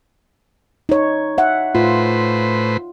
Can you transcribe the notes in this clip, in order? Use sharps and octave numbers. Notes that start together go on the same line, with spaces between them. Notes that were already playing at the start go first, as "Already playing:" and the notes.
D#4 C#5
E5 F#5
A2 F4 B4 C5